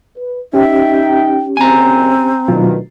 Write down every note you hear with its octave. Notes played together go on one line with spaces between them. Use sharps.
B4
C#4 D#4 G4 E5 G5
F#1 C4 G#5 A#5
D2 B2 D#3 F#3 F4 B4